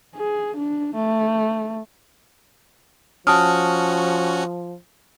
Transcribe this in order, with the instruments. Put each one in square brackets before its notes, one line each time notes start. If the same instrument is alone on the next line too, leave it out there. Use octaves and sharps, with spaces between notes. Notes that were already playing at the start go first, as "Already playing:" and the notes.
[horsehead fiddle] G#4
D4
A3
[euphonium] F3 [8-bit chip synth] C#4 F#4 [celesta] A5 D#6 F6